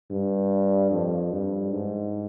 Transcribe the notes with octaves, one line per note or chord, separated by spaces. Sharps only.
G2
F2
G2
G#2